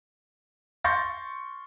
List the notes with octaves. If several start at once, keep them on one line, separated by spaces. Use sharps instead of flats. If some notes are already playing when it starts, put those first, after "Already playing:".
C6 C#6 G6 A6 A#6